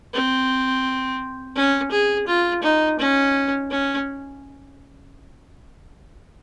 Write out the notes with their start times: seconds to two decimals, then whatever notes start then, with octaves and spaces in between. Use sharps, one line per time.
0.14 C4
1.56 C#4
1.92 G#4
2.28 F4
2.63 D#4
2.99 C#4
3.71 C#4